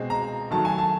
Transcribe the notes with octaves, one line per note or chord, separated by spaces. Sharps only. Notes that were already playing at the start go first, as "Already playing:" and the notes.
Already playing: B2 G#3 C4
A#5
D#3 F#3 A3 A5
G#5
A5